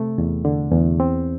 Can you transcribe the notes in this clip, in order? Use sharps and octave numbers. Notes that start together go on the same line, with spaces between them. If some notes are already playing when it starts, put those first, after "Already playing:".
Already playing: C3 A3
E2
D3
E2
C4